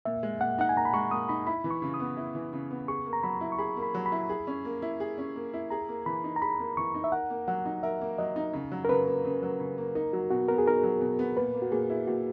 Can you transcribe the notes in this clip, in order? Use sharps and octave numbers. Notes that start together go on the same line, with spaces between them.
A#2 E5
G#3
A#2 F#5
D#4 F#5
G#5
A#2 A#5
B5
G#3 C#6
A#2 D#6
D#4 B5
E4 B5
E3
C#6
C#3
D#6
B3
E4
E3
C#3
B3
G#4 C#6
A#3
A#5
F#3 B5
E4
C#6
G#4 B5
A#3
B5
F#3
B5
E4
G#4
C#4
A#3
E4
G#4
C#4
A#3
E4
G#4 A#5
A#3
E3 B5
D#4
A#5
G#4 B5
A#3
E3 C#6
D#4
E5
A#4 F#5
A#3
F#3 F#5
D#4
A#4 E5
A#3
F#3 D#5
D#4
C#3
F#3
A#4
C#3 B4
A#3
C#3
F#3
C#3
A#3
D#4 A#4
F#3 F#4
B2 F#4
B3 A#4
G#4
D#4 A#4
F#3
B2
B3
A#2 B4
A#3
F#4
A#2 G#4
E4
A#2 F#4